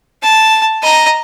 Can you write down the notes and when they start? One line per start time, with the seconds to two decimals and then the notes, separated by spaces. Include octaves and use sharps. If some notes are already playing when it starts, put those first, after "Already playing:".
0.23 A5
0.83 D#5 A#5